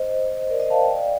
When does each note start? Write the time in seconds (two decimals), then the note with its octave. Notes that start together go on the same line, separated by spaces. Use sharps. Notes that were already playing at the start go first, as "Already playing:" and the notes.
Already playing: C5 D#5
0.50 A#4 D5
0.60 C5 D#5
0.70 F5 A5
0.80 D#5 G5
0.90 D5 F5
1.02 F5